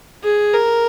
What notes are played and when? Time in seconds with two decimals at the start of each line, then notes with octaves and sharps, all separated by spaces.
0.24 G#4
0.54 A#4